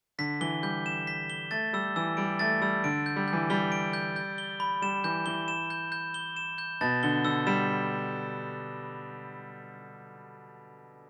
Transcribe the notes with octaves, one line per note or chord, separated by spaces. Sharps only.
D3 B6
E3 G7
G3 G6
E7
B6
G7
A3 A6
G3 E6
E3 E6
G3 D7
A3 A6
G3 E6
D3 D7
G6
G3
G6
E3
G3 G7
D7
G6
G6
G7
B5
G3 E7
E3 G6
E3 G7
E7
G6
G6
G7
E7
G6
B2 A6
D3 G7
D3 E6
G3 E7